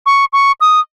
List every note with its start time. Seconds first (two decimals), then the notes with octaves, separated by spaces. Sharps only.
0.06 C#6
0.33 C#6
0.61 D#6